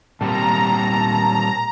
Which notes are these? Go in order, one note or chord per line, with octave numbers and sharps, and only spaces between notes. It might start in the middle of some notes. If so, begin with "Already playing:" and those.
A#2 G3 C4 A5 A#5